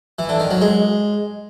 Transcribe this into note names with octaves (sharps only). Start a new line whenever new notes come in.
E3
D3
D#3
F#3
G#3